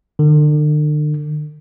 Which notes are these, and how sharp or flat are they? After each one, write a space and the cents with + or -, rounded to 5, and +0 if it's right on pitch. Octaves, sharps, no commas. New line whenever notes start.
D3 +40